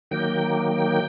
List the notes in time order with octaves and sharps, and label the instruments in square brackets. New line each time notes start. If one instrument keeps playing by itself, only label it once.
[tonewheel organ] D#3 F#3 A#3 G5